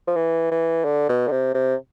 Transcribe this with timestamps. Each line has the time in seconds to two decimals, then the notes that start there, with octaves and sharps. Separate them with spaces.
0.07 F3
0.16 E3
0.51 E3
0.85 D3
1.09 B2
1.27 D3
1.31 C3
1.54 C3